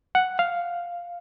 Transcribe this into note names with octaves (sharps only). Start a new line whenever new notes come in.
F#5
F5